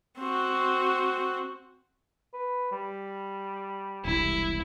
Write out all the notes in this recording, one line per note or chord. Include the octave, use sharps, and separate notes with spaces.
C4 F#4
B4
G3
E1 C2 E4